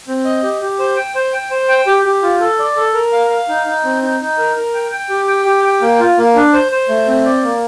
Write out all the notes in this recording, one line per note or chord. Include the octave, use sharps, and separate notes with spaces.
C4
D#5
G4
G4
C5
G5
C5
G5
C5
G5
G4
G4
F4
A4
D5
A4
A#4
F5
F5
D#4
D#4
C4
D#4
D#4
A#4
A#4
G5
G5
G4
G5
G4
G5
A#3
F4
A#3
D4
C5
C5
A3
C4
D5
A#3